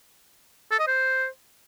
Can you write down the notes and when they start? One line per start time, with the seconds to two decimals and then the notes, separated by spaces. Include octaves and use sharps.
0.71 A4
0.79 D#5
0.87 C5